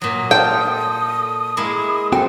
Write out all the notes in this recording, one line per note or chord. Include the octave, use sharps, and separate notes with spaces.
A#2 F#3 D#6
F4 A4 G5
G#3 A#3 E4
C4 F#4 A4 C5 G5